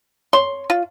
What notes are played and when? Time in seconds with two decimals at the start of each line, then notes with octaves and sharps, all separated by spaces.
0.33 C#5 C6
0.70 F4